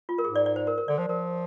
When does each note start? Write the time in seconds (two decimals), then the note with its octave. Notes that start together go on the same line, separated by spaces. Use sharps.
0.09 F4
0.18 A#4
0.24 G#2 G#4
0.35 D5
0.46 D5
0.56 C5
0.67 A#4
0.78 A#4
0.88 D3 D5
0.98 F3 C5
1.08 F3 A#4